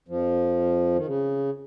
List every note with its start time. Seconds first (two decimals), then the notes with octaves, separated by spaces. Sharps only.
0.08 F2 F3
0.96 D#3
1.06 C#3